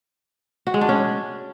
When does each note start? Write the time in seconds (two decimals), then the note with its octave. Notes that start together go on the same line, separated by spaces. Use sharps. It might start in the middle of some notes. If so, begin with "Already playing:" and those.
0.67 F#4
0.74 G#3
0.81 D4
0.89 C#4